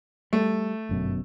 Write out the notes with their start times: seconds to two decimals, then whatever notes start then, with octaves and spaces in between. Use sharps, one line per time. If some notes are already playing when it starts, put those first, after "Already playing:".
0.33 G3 A3
0.89 G1 F#2 B2